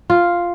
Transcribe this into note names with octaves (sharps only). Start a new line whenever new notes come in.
F4